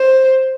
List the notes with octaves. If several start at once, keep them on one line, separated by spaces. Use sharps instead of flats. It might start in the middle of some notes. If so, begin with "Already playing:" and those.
Already playing: C5